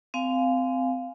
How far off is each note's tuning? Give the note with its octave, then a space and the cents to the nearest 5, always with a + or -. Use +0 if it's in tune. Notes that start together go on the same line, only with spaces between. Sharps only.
C4 -25 F5 +0 G#5 +0